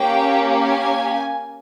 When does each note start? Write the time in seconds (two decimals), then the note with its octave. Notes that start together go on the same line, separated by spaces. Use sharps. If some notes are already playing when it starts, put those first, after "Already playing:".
Already playing: A#3 C#4 G4 G5
0.60 G#5